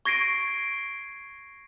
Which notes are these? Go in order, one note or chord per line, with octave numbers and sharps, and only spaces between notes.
C#6 G#6 A#6 C7 D7 D#7